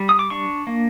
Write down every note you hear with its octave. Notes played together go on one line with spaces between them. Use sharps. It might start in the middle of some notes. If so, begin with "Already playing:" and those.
Already playing: G3
D#6
D6
D4 C#6
A#3